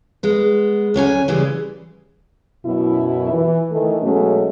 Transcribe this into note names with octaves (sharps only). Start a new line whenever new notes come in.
G#3 B3
D2 F#3 C#4 G#5
C#3 E3 G3 G#3
F#2 B2 E4
E3
D#3 E3 A3
B2 F#3 G#3 A3 C#4